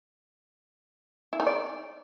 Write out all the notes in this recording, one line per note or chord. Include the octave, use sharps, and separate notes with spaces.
E4
D#4
D5